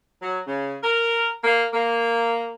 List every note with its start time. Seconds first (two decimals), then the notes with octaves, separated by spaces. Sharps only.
0.21 F#3
0.47 C#3
0.82 A#4
1.44 A#3
1.73 A#3